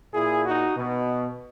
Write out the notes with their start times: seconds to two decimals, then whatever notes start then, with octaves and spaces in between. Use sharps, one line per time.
0.13 A#2 E4 G#4
0.44 D#4 F#4
0.77 B2